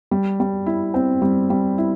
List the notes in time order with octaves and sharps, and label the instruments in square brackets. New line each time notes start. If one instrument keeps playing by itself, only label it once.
[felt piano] G3
G3
E4
C4
G3
G3
E4